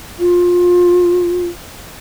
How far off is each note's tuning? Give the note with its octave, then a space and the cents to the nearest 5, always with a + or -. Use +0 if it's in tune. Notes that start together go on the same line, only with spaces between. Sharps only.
F4 +20